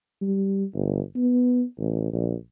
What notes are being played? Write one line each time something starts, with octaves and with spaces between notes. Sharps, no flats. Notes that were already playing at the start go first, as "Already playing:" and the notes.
G3
G1
B3
A1
A#1